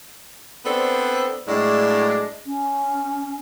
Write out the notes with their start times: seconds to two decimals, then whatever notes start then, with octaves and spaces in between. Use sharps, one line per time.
0.65 B3 C4 D4 A4 C5
1.48 A2 F#3 G#3 D4
2.46 C#4